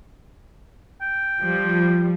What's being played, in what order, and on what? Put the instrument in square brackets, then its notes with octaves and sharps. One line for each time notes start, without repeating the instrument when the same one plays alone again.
[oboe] G5
[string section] F3 G3